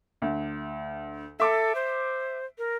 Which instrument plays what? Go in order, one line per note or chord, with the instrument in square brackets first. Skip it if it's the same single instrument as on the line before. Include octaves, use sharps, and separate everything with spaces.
[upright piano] D2
[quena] A4 [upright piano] E5 D6
[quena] C5
A#4